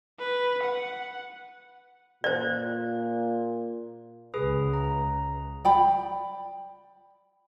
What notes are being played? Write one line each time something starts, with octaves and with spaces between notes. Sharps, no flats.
B4
F#5
A#2 F4 C5 D5
C#2 C#3 G#4 B4 D#6
A#5
D5 G5 B5